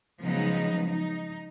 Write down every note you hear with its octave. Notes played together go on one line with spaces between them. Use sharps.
C#3 F3 F#3 G#3 B3 D#4
D#4